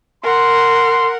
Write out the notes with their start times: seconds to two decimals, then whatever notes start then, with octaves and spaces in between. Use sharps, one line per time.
0.23 A#4 F#5 C6